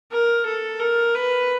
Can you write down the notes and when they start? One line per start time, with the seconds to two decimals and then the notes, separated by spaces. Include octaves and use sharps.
0.11 A#4
0.46 A4
0.80 A#4
1.15 B4